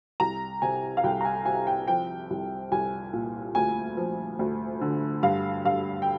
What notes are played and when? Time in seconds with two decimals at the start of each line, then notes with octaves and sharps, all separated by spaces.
0.20 C2 A#5
0.62 C3 G#5
0.97 F5
1.04 C2 G5
1.21 A#5
1.25 G#5
1.46 C3 G#5
1.67 G5
1.88 F3 G5
2.30 C2
2.72 C2 G#5
3.13 A#2
3.55 D2 G#5
3.97 F3
4.39 D2
4.81 D3
5.23 G2 F5
5.65 G2 F5
6.02 G5